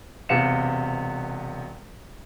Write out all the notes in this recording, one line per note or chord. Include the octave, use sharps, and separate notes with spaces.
E1 C3 B3 F5 C#7 E7